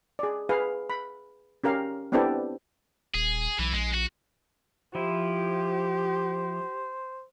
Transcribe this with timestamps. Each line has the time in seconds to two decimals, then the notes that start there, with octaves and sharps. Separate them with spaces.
0.19 G#4 D5
0.49 G#4 B4 F5
0.90 B5
1.64 C#4 G4 A#4 F5
2.12 B3 C4 D4 E4 G4 A4
3.14 D#1 G#4
3.59 B1 E3
3.73 A#1 G#3
3.94 F#4
4.95 F3 E4 G4 C5